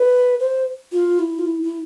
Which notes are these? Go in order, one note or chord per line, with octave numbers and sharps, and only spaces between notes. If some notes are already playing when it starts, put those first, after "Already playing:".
Already playing: B4
C5
F4
E4
F4
E4
E4